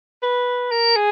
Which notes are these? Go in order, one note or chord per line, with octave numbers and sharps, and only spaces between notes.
B4
A#4
G#4